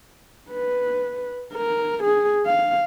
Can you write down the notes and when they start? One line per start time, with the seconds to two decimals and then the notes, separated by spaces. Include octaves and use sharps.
0.51 B4
1.53 A#4
2.04 G#4
2.46 F5